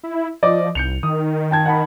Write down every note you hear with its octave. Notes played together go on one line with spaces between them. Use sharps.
E4
F3 D5 D#5 D6
C2 G6 C#7 F7
D#3 D#6
G5 A5 G#6
F#5 A5 B5